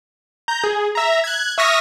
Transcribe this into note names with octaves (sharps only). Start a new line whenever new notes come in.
A#5 G6
G#4
E5 A#5
F#6 G#6
E5 C#6 D#6 F6 A#6 B6